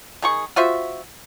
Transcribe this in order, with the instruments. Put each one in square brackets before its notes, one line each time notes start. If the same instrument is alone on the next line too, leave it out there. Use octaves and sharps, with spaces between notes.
[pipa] D#3 G#4 C#6
F4 F#4 C5 E5